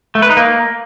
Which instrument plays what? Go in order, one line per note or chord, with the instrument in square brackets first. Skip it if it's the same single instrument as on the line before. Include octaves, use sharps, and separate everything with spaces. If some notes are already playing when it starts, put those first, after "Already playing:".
[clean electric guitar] A3
B4
D#4
A#3